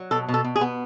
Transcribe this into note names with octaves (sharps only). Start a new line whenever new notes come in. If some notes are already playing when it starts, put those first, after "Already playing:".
Already playing: F#3
B2 A4
B2
A4
B2
G#4
B3